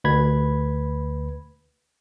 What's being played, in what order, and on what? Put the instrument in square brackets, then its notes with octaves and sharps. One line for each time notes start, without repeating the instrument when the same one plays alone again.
[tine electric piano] D2 B4 B5 G#6